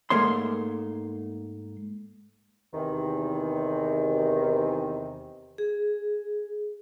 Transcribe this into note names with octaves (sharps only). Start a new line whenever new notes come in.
G#2 A3 A#3 C#5 C6
E2 C3 D#3
G#4